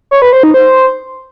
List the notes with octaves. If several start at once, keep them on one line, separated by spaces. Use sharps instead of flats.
C#5
B4
C5
D#4
C5